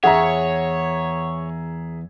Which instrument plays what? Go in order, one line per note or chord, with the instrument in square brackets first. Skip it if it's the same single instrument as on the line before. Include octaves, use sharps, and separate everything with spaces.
[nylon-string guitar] E2 E3 [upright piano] G#4 E5 A#5 [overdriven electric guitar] C#5 [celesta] F#5